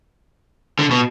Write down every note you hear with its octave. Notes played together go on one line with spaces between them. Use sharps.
D3
B2